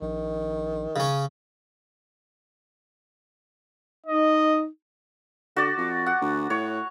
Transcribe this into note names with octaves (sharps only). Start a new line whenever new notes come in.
A#1 D#3
C#3 C#4
D#4 D#5
D3 F#4 D5
F2
F#5
D2
A2 C#5